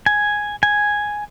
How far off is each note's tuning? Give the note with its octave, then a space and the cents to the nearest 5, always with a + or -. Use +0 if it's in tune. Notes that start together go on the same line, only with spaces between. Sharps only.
G#5 +0
G#5 +0